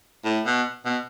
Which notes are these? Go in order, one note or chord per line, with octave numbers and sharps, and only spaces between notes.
A2
B2
B2